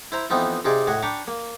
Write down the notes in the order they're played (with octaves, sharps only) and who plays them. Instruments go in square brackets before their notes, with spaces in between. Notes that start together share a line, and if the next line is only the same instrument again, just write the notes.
[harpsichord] E4 C5 A#5
F2 E3 B3 C4 D#4 F4
C3 D#4 F4 G#4 D5 D#5
A2 F#4 D#5 G#5
D4 G5 A#5 B5 C#6 D6
A#3